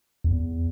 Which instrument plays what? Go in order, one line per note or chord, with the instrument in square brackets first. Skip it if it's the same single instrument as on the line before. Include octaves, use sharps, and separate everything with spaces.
[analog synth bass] E2